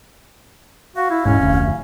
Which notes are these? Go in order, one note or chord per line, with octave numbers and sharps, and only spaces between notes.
F#4 F5
E4
D#1 G#1 G#2 C#4
F1 D2